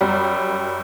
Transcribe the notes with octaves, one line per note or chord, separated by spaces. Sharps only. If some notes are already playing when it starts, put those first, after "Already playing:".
F#2 G3